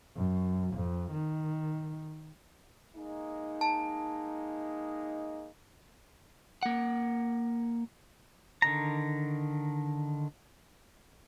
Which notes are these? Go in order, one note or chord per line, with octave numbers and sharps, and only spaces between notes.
F#2
F2
D#3
G#3 A#3 D#4
A5
A#3 F#5
D3 D#3 A#5